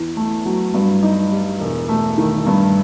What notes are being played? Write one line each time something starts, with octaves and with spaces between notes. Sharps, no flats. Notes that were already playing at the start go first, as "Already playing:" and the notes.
Already playing: E2
A3
F#3
G2
D#4
G3
E1
A3
D#3
G2